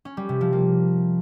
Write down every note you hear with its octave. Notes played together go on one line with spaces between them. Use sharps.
C#4
G3
C3
F3
A#3